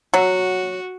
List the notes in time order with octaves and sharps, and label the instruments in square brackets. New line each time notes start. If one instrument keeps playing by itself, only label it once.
[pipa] F#3 [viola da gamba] F#4